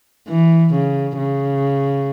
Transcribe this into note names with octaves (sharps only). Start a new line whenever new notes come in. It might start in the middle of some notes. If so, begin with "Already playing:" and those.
E3
C#3
C#3